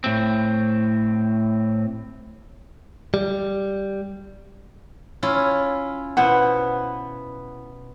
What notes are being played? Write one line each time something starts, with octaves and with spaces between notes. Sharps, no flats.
A2 C4
G3
C#4 E4 F4
B2 B3 E4 C5 F#5